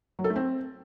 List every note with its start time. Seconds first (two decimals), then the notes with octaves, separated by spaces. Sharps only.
0.19 F#3
0.24 A4
0.30 A3
0.36 C4